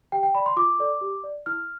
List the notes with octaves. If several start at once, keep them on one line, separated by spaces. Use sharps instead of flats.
G4 G5
G5
D5 B5
C6
F4 D6
A4 D5
G4
D5
E4 F6